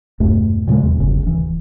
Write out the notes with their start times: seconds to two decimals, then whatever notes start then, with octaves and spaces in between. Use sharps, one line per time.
0.20 E2 G2 B2 A3
0.67 A#2 C#3 G3 G#3
0.83 E2
1.00 G1 C2 F#2 C#3
1.23 D1 E3